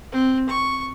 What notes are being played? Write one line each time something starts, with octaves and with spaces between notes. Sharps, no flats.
C4
C#6